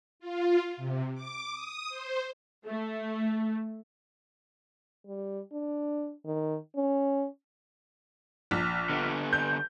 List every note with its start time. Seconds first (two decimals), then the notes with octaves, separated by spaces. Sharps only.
0.20 F4
0.77 C3
1.14 D6
1.51 D#6
1.89 C5
2.66 A3
5.06 G3
5.52 D4
6.25 D#3
6.76 C#4
8.51 A#1
8.90 D3 B3
9.33 G6